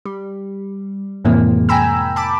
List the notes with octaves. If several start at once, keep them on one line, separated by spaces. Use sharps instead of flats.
G3
F2 A2 C3 E3 G#3 A#3
G5 G#5 A#5 B5 E6
A5 B5 D6